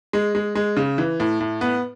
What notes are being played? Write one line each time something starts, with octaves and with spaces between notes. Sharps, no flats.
G#3
G#3
G#3
C#3
E3
A2
A2
B3